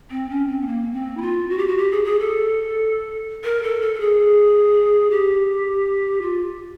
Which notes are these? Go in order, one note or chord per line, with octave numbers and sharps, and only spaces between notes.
C4
C#4
C4
B3
A#3
C4
E4
F4
F#4
G4
F#4
G4
G#4
G#4
A4
A#4
A4
A4
A4
G#4
G4
F4